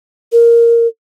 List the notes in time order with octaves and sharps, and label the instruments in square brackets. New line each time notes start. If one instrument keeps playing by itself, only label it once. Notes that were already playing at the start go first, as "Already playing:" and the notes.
[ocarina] A#4